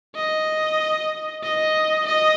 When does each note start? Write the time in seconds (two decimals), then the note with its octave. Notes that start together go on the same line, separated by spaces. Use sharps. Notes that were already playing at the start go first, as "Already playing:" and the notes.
0.16 D#5
1.44 D#5
2.07 D#5